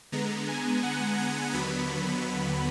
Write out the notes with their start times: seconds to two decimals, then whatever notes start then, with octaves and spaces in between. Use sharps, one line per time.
0.12 D3 G#3 B3 A#5
0.48 G#5
0.83 F#5
1.18 G#5
1.53 D#2 D3 F#3 B3 B5